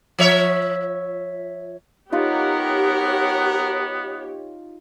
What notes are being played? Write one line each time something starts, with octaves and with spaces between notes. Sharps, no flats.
F3 C#5 E5
B3 D#4 F4 G4 A#4 C#5 F5 F#5